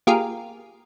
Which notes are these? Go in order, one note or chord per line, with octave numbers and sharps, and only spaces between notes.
A#3 F4 G4 G#4 A#4